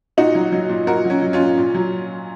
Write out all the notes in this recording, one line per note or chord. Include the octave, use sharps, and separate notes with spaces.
A#2 D#4 F#4
F#3
F#3
A#2
A#2 F#4 A#4
F#3 C#4
F#3
C#4 F4
A#2
A#2
F#3